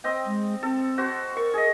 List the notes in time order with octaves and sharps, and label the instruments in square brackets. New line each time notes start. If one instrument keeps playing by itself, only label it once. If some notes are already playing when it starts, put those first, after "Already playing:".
[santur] C4 D#5 G5
[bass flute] G#3
[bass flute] C4 [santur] A4
[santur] F#4 C5
[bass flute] A#4 [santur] C#6
[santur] G#4 D#5